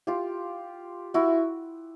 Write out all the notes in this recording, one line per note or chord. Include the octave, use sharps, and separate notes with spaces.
F4 G4
E4 F#4